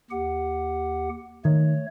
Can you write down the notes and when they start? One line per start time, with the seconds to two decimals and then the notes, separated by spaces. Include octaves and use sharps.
0.11 D#2 G4 F#5
1.45 D#3 A3 C#5